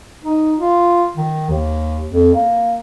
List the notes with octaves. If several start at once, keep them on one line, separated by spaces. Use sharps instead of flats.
D#4
F4
D#3
D#2
F2
A#3